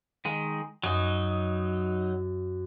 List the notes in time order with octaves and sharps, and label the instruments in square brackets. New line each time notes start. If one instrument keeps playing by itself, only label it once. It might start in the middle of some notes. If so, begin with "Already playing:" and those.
[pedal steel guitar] D#3 G#3
[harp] F#2 [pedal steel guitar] F#3 D#4